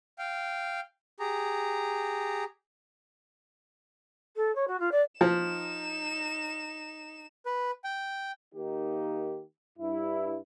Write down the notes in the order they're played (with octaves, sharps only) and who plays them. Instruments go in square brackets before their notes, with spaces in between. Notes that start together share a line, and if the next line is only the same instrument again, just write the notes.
[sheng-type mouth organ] F5 G5
G4 G#4 A#5
[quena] A4
C#5
F#4
F4
D5
[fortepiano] F3 [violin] D#4 E7
[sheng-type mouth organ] B4
G5
[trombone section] D#3 A#3 D#4 G4
G2 E4